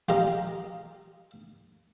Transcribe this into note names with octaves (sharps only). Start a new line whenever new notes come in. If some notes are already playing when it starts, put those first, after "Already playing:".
F4 G4 D#5 A#5